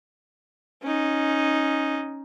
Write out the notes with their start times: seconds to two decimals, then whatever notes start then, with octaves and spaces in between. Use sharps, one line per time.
0.83 C#4 D#4